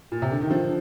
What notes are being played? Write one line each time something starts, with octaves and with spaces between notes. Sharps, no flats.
A#2
C3
D3
D#3
D3 F3